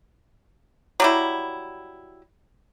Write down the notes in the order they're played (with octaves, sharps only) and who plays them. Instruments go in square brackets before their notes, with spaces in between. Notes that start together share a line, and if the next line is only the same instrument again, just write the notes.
[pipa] F#3 G3 E4